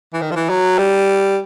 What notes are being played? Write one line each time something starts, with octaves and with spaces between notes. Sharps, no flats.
E3
D#3
F3
E3
F#3
G3